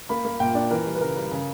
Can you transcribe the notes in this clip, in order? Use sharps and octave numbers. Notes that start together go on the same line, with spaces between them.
A#3 B5
A#3
A#2 G5
D4
E3 A#4
G3
B4
C#3 A#4
G3
C#3